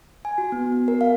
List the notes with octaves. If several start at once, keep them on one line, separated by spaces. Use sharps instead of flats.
G#5
F#4
B3
B3
A#4
F5